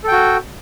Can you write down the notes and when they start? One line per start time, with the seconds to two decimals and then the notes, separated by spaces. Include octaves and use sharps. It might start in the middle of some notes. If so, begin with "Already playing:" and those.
0.04 A4
0.08 G5
0.12 F#4